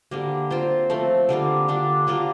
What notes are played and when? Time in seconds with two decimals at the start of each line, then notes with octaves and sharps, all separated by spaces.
0.11 D3 G3 A#3
0.51 C4 F4 C5
0.90 F3 A3 C4
1.29 D3 G3 A#3 F4
1.68 D3 G3 D4
2.07 D3 G3 A#3 F4